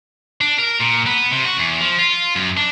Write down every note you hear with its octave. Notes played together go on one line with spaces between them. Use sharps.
D4
A#4
A#2
B3
C3
F#4
E2
F3
F4
F#2
D4